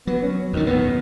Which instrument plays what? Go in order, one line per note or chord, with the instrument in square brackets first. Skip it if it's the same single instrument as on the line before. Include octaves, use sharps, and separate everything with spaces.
[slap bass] F#3 [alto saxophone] B3
[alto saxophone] C#4
[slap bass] D#2 A#2 [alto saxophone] D#3
[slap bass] D#2 A2 [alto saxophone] B3